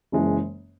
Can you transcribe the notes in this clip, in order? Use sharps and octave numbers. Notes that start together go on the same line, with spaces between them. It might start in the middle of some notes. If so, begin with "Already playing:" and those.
F#1 F#2 E3 G#3